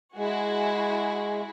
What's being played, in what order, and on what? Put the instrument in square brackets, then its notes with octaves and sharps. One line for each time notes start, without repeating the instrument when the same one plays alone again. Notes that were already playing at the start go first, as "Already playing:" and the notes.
[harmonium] G#3 [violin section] E4 F#4 G#4